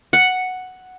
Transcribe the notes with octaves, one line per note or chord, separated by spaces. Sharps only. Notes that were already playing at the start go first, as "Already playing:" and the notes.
F#5